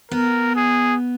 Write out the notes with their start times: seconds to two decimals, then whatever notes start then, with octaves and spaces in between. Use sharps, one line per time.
0.11 B3 A#4
0.56 G#4